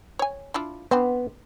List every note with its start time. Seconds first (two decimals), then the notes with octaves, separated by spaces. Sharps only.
0.19 C#5 G#5
0.54 D4 E4 F4
0.91 B3 C4 D4